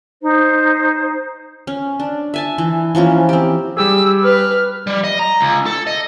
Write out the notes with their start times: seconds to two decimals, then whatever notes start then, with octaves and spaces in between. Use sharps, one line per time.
0.21 D#4 C5
1.67 C#4
2.00 D4
2.34 E5 G#5 A5
2.58 E3
2.95 E3 F3 A#3 C#4
3.29 C4 G4
3.77 G3 G4 G#4 E6
4.23 B4 F6
4.87 G3
5.04 D#5
5.19 A#5
5.41 C#2
5.66 A4
5.87 D#5